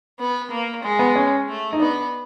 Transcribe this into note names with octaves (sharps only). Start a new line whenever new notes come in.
B3
A#3
G#3
B3
C#4
A3
D#4
B3 D4